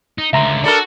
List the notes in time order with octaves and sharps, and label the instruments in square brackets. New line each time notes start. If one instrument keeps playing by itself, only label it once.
[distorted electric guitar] D#4
[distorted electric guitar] C#2 D3 [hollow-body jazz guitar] E5 A#5 C6
[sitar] D4 A4 A#4 [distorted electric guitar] F#4